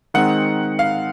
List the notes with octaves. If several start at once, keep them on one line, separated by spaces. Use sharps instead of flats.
D#3 G#3 C4 D#4 F#5
F5